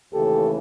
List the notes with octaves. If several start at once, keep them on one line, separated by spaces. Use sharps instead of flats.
D#2 C#3 E3 A3 G4 A4